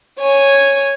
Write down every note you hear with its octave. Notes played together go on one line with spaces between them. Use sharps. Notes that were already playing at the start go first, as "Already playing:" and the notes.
C#5 G#5